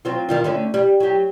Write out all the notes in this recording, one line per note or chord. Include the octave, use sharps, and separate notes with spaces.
F#3 C4 F4
D#3 G3 F4
D3 A3 C#4
G3
F#3 G4